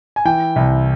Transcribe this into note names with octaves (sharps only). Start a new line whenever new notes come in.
G#5
E3 G5
C2